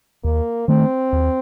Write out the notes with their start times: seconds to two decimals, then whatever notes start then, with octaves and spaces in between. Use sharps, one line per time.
0.24 D#2 A#3
0.68 D#3 A3 C4
1.13 D#2